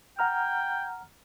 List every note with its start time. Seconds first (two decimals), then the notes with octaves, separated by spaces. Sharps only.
0.19 F#5 G5 A#5 F6